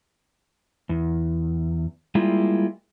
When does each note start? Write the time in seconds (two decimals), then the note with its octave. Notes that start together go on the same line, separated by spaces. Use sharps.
0.89 E2
2.15 G3 G#3 A#3 E4 F4